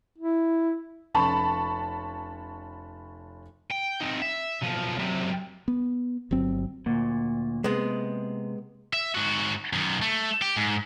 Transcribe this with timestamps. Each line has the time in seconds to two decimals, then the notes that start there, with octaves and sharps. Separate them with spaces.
0.19 E4
1.14 F1 C#4 A5 B5 C#6
3.71 G5
4.01 C4 D#4
4.22 E5
4.62 B1 F3
4.99 F#2 C3
5.68 B3
6.31 G1 F#3 C4
6.86 D2 A#2 A#3
7.64 C3 G#3 B3
8.93 E5
9.15 G#2 F#4
9.73 F#2 D#3
10.02 A3
10.42 G4
10.57 G#2